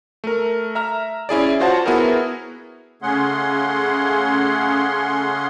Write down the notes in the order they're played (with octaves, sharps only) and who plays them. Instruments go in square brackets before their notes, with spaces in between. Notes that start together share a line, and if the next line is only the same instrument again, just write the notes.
[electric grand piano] A3 A#4
E5 A#5 F6
C#4 E4 G#4 D5
F4 F#4 C5 C#5 F#5 A5
B3 E4 F#4 G#4 A#4
[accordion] C#3 A3 C#4 G#4 F#5 C6